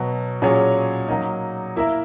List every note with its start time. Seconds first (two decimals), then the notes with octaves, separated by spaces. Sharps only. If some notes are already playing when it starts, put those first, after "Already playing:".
Already playing: B2 F#3 B3
0.42 A#2 F#3 C#4 G#4 C#5
1.08 F#3 A#3 D#4
1.76 A#3 E4 A#4 E5